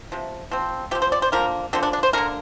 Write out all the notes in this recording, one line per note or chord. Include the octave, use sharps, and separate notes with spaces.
C3 F3
F3 C4
F3 C4 G4
C5
D5
C5
D3 F3 A#3 A#4
D3 F3 A#3 C4
D4
D4
C5
D3 A#3 A#4